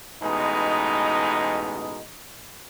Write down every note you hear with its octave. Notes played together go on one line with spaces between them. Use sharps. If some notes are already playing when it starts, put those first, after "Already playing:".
A1 B2 G#3 D#4